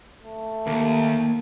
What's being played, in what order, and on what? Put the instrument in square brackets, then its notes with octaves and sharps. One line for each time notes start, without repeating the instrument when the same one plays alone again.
[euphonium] A3
[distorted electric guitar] D#2 [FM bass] A#3